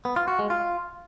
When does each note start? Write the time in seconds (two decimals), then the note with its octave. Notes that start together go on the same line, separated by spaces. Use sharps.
0.05 B3
0.16 F4
0.28 F#4
0.39 G#3
0.50 F4